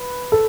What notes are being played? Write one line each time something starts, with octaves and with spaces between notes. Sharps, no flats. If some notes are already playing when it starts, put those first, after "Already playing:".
Already playing: B4
A4